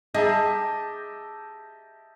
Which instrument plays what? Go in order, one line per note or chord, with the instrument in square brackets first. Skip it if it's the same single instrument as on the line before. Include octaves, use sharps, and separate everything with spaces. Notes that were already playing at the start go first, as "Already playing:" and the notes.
[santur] G4 A5 A#5 [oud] G#4 [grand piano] D#5 E5